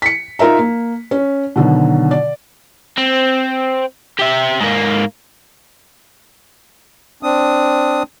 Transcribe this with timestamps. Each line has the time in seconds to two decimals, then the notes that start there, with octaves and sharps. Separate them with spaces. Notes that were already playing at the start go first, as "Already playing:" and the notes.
0.02 B6 C#7
0.39 D#4 F4 A#4 E5 A#5
0.59 A#3
1.11 C#4
1.56 B2 D3 D#3 F#3
2.11 D5
2.98 C4
4.19 G4 E5
4.60 G#2 A#3
7.23 C4 D4 D#6